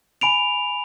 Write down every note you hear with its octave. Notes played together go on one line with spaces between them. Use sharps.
G#5 B5 D7 F7